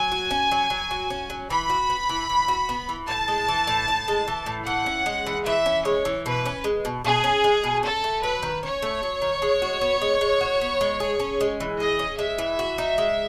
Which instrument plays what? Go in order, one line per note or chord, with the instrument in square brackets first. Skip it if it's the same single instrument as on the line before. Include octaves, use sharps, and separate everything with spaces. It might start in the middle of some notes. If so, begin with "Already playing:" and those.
Already playing: [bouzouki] F#3 [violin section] G#5
[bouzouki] F#4
C#4
F#3
F#3
F#4
C#4
F#3
[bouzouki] E3 [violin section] B5
[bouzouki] F#4
B3
E3
E3
F#4
B3
E3
[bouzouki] A2 [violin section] A5
[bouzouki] G#3
E3
A2
A2
G#3
E3
A2
[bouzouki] E3 [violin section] F#5
[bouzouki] C#4
G#3
E3
[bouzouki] E3 [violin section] E5
[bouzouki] C#4
[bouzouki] G#3 [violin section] C#5
[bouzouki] E3
[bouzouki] B2 [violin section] B4
[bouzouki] C#4
G#3
B2
[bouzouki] B2 [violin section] G#4
[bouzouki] C#4
G#3
B2
[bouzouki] C#4 [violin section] A4
[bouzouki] A3
[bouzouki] F#3 [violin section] B4
[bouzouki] D#3
[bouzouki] C#4 [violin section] C#5
[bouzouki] A3
F#3
D#3
G#3
F#4
B3
G#3
G#3
F#4
B3
G#3
G#4
C#4
G#3
E3
[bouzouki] G#4 [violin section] D#5
[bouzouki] C#4
[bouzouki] G#3 [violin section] E5
[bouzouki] E3
F#4
D#4
G#3